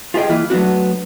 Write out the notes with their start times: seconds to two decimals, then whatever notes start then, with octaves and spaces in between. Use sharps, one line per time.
0.14 F4 G4 G#4 D#5 G5
0.29 E3 A#3 E4 F4
0.50 F#3 A3 B3 D4 F#4